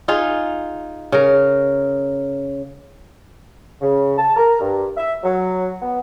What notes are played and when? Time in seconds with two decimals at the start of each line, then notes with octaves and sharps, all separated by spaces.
0.08 D#4 F4 G#4
1.12 C#3 A#4
3.81 C#3
4.17 A5
4.36 A#4
4.59 G2
4.96 E5
5.23 F#3
5.81 B3